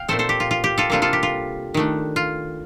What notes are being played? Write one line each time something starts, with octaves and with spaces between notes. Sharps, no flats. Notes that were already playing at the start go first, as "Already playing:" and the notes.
Already playing: F5 G5
A#2 A3 C4 A4 C5
A4 C5
G4
F4
F4
G4
F4 A4
C3 G3 A#3 D4 F4 A4
F4 A4
G4
F4
D#3 A3 D4
F4